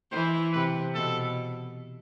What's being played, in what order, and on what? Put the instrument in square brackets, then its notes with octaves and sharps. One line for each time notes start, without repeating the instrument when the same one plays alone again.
[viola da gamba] E3 [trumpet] C5
[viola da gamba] C3 [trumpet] B4
[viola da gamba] B2 [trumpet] A4